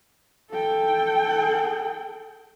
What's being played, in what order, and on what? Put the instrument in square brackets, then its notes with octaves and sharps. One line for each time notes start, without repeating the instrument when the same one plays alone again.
[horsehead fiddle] A4 G5